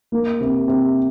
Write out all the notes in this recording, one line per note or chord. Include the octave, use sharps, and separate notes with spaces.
A#3
C3
C3